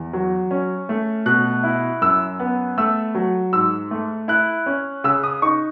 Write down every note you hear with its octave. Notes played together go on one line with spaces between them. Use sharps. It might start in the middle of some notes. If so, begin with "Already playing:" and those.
Already playing: E2
F#3
C#4
A3
B2 F#6
E4
F#2 E6
B3
A3 E6
F#3
G#2 E6
A3
E4 F#6
C#4
C#3 E6
D#6
D#4 C#6